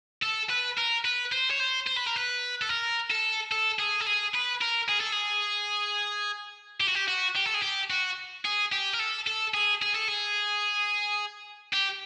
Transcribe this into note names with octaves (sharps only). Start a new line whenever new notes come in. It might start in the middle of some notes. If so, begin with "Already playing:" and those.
A4
B4
A#4
B4
C5
C#5
C5
C5
B4
A#4
B4
A4
A#4
A4
A4
G#4
A4
G#4
B4
A#4
G#4
A4
G#4
G4
F#4
G4
F#4
G4
A4
G#4
G4
F#4
G#4
G4
A#4
A4
A4
G#4
G#4
A4
G#4
G4